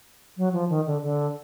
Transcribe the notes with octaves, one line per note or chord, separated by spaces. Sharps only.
F#3
F3
D#3
D3
D3